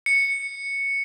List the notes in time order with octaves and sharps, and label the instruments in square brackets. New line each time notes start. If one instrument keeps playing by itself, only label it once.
[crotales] C#7